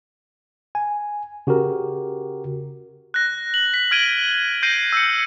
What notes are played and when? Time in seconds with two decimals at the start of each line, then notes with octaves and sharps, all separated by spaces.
0.75 G#5
1.47 C#3 F#4 G4 A#4
3.14 F#6 A#6
3.54 F#7
3.74 B6
3.91 F6 G#6 D7 D#7 F#7 G7
4.63 G6 A#6 C7 D7 D#7
4.93 E6 C#7